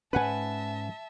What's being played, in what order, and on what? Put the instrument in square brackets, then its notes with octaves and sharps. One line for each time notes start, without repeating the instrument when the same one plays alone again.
[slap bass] G#2 C#4 [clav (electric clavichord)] B4 F#5 G#5 [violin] E5 A5